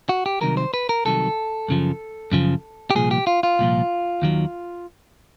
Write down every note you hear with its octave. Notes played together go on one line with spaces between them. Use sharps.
F#4
G4
C2 C3 D#3 F#3 A#4
C5
B4
A#4
C2 C3 D#3 F#3 A4
F#2 C#3 F3
F#2 C#3 F3
G4
C2 A#2 F3 G#4
G4
F4
F4
C2 A#2 F3
D#2 D#3 F#3